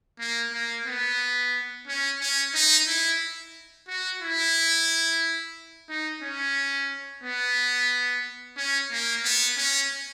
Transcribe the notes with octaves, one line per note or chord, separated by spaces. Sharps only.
A#3
A#3
B3
C#4
C#4
D#4
E4
F#4
E4
D#4
C#4
B3
C#4
A#3
B3
C#4